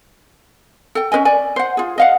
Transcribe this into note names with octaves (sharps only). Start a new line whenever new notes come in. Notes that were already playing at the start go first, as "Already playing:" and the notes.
A4 G5
C#4 B4 D#5 G#5
D5 G#5
C5 F#5
F4 G#4
D#5 F5 F#5